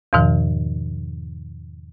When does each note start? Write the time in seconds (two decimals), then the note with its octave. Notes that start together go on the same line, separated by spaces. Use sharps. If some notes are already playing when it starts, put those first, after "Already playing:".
0.13 E2 G#2 B2 D#3 F3